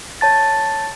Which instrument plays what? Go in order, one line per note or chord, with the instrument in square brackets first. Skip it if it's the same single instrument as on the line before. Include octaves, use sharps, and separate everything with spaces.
[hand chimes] C#5 A5 A6